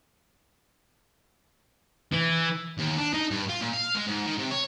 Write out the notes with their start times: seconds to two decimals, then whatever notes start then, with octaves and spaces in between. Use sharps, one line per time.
2.12 E3
2.79 D#2
2.97 D4
3.14 D#4
3.31 G2
3.49 F4
3.61 A#2
3.73 F5
3.95 G#3
4.07 G#2
4.26 D#3
4.38 C3
4.51 C#5